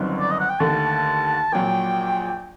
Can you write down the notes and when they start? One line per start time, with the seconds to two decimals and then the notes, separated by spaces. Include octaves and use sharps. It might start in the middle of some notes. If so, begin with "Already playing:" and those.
Already playing: G1 F#2 D#3 F#3 C4
0.20 D5
0.31 D#5
0.40 F#5
0.49 G5
0.60 D#2 D3 A3 A5
1.52 A#1 A#2 F#3 G5